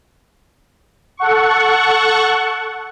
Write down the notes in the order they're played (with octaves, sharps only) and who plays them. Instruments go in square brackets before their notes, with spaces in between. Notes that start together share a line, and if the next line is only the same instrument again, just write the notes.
[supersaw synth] A4 F#5 C#6